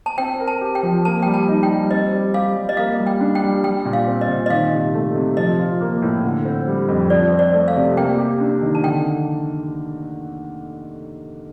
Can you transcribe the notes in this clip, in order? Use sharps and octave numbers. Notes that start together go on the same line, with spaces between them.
A5
C4 G5
A#4
A5
G4
G5
F3
A#3 A5
G3 G5
A5
D#4
G5
G3
C4 D#5
G3
G4 F5
G3
D#5
A#3 F5
G3
G5
D4
G5
G3
G3 G5
A#2
F5
C4
D#5
A#2
D#5
D#3 F5
C3
A3
C3
F3 D#5
F4
A#3
A2
D3
C4
G3
F2
F3 D5
C4
D5
A3
F5
C3
A#3 G5
G4
D4
D#3
A5
D3 G5